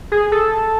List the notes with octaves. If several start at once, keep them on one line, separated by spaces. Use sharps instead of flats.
G#4
A4